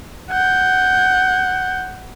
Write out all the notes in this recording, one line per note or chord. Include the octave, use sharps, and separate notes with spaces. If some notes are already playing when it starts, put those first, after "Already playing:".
F#5 G6